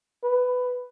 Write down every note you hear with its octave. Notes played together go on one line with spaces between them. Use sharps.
B4